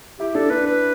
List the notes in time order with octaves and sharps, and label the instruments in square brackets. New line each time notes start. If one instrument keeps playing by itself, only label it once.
[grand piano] E4 [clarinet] G4
[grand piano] D4 [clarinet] A4
[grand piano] D4 [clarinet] B4
[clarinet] B4